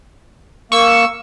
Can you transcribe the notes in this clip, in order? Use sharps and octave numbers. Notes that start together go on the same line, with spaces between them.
A#3 C#6 E6